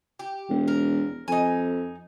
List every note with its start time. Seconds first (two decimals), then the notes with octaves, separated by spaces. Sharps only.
0.19 G4
0.49 E1
0.68 A#4
1.28 F2 D#4 G#5